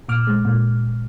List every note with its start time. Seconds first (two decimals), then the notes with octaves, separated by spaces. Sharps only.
0.09 A#2 D6 F6
0.27 G#3
0.45 A#2